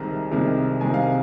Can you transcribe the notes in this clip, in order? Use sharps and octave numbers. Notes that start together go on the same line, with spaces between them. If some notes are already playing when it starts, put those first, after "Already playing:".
Already playing: C2 C3 D#3 G#3 A#5
C2 C3 D#3 G#3
C2 C3 D#3 G#3 G#5
F5